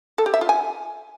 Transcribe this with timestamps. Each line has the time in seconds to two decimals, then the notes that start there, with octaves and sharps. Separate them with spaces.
0.18 A4
0.26 G4
0.34 E5
0.41 F4
0.49 G#5